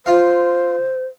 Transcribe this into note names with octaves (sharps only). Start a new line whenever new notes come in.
F4 C5 F5